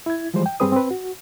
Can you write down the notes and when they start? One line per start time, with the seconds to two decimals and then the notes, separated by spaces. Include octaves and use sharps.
0.06 E4 G#6
0.34 E3 F3 G3 G#3 C5
0.46 G5
0.60 G2 G3 C4 G#4 B4 D#6
0.72 C4 B4
0.91 F#4